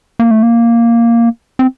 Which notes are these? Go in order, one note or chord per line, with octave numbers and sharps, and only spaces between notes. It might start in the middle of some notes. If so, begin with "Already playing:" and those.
A#3
A3
A#3
C4